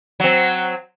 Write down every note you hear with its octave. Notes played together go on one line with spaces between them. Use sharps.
F#3 C4